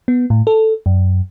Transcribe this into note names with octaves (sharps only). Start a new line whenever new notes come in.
B3
A2
A4
F#2